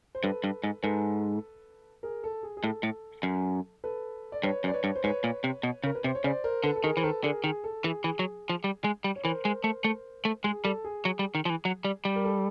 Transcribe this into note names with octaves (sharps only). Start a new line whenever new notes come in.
C5
G2 A4 B4
G2
G#2
G#2 A4 B4
G#4 A#4
A4
G#4
G#4
A2 A4
A2
F#2
A4 B4
D5
G2 B4 C#5
F#2
D5
B4 C#5
G2
C5
G#2 B4 C#5
A#2
C3
B2
C#3 A#4
B4
C3 C5
C#5
C#3 C5 D5
A#4 C5
D3 A4 B4
A4
D#3 G#4 A#4
E3 C5
D#3 A4 B4
D3 G#4 A#4
D#3 G#4
A4
E3 G#4
E3 G#4
F#3
F3
G3
G#3
G3
C#5
E3 A#4 C5
G#3
A3
A3
A3
G#3 G#4
G3 A4
G#4
F#3
G3
D#3
F3
E3
F#3
G3
G3
A#4
A4